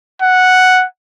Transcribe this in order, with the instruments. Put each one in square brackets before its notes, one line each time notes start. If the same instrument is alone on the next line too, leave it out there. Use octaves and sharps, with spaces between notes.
[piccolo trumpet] F#5